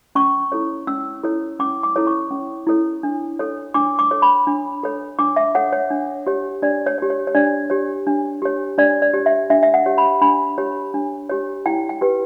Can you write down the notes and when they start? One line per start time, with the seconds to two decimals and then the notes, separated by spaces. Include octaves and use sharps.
0.15 C#4 C#6
0.52 E4 A4 C#5
0.87 C#4 E6
1.23 E4 A4 C#5
1.59 C#4 D6
1.83 D6
1.96 E4 A4 C#5
2.07 C#6
2.31 C#4
2.67 E4 A4 C#5
3.03 D4
3.39 A4 C#5
3.74 D4 D6
3.99 D6
4.11 A4 C#5
4.22 B5
4.47 D4
4.83 A4 C#5
5.19 D4 D6
5.36 E5
5.55 A4 C#5 F#5
5.72 C#5
5.91 D4
6.27 G4 C#5
6.62 D4 D5
6.86 C#5
6.98 C#5
7.02 G4
7.10 C#5
7.27 C#5
7.35 D4 D5
7.70 G4 C#5
8.07 D4
8.42 G4 C#5
8.78 D4 D5
9.02 D5
9.14 G4 C#5
9.26 E5
9.50 D4 E5
9.63 E5
9.74 F#5
9.86 G4 C#5
9.98 B5
10.22 D4 B5
10.58 G4 C#5
10.94 D4
11.29 G4 C#5
11.66 E4 G5
11.89 G5
12.01 G4 B4